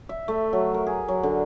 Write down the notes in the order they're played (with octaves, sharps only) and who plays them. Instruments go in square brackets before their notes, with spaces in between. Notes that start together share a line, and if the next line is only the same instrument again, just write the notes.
[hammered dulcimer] E5
A3
F#3
A#4
G#4
F#3
D3